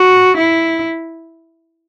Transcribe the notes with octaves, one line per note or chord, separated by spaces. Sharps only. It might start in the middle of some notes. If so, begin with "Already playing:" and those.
Already playing: F#4
E4